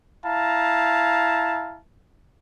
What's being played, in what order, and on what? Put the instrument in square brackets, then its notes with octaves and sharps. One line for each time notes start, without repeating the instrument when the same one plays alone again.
[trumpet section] E4 F5 A5 A#5